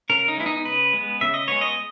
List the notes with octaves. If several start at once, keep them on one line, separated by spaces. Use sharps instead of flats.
C#3 A#4
D#4
G#3 B3 E4
D#4
C#3 B4
G#3 B3
C#3 E5
D#5
G#3 B3 C#5
D#5